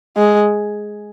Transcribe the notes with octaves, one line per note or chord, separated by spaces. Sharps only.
G#3